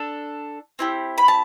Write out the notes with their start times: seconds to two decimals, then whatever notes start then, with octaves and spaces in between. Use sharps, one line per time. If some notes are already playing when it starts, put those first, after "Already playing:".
Already playing: D4 A4
0.79 C4 E4 G4
1.18 B5
1.28 A5